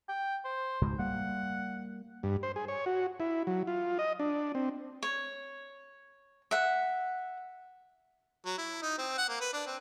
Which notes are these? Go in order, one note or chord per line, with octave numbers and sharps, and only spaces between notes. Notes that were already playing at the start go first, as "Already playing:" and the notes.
G5
C5
C#2 G#2 B2
G3 A#3 F#5
G2
C5
G#4
C#5
F#4
E4
F#3
F4
D#5
D4
C4
C#5
E5 F#5
F#3
E4
D#4
C4
F#5
A#3
B4
D4
C4